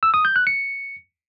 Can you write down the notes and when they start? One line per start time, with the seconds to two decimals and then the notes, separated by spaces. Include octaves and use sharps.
0.03 E6
0.14 D#6
0.25 G6
0.36 F#6
0.47 C#7